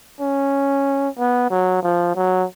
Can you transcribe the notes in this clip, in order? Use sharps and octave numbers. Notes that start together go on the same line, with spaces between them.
C#4
B3
F#3
F3
F#3